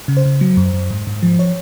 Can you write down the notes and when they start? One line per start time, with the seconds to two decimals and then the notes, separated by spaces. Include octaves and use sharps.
0.08 C#3
0.17 C5
0.26 C#3
0.41 F#3
0.57 F#2
0.73 F#2
0.91 G#2
1.07 G#2
1.23 F3
1.39 C#5